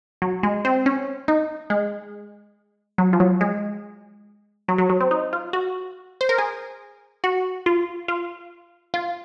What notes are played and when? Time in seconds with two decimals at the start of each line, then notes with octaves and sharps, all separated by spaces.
0.22 F#3
0.43 G#3
0.65 C4
0.86 C#4
1.28 D#4
1.70 G#3
2.98 F#3
3.13 F3
3.20 F#3
3.41 G#3
4.68 F#3
4.78 F#3
4.90 F#3
5.00 C4
5.11 D#4
5.33 F4
5.53 F#4
6.21 C5
6.29 A#4
6.38 G#4
7.24 F#4
7.66 F4
8.08 F4
8.94 F4